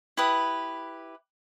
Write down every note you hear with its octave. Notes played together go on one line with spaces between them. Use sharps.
E4 G4 B4 D#6